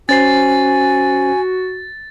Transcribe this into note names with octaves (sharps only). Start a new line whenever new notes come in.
C#4 F#4 C5 G#5 A6 C7